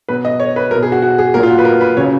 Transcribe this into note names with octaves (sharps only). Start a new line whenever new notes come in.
B2 F#3 B4
D#5
C#5
B4
B2 F#3 A#4
G#4
F#4
F#4
G#4
A#2 F#3 A#4
F4
F#4
B4
A#4
B4
C#3 F#3 C#5